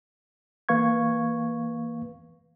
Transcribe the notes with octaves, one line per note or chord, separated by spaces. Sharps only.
E3 A#3 B4 F5 C#6 G#6